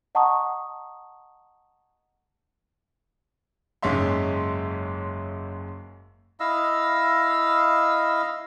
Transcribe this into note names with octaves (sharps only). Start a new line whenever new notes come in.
D#5 F#5 A5 A#5 C#6 D#6
F#1 G#2 G#3 C#4 E5 C6
E4 D#5 F5 E6